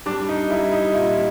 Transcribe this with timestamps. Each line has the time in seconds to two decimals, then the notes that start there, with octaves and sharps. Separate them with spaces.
0.06 G3 D4
0.29 D#4
0.50 G3 E4
0.72 D#4
0.94 A#2 E4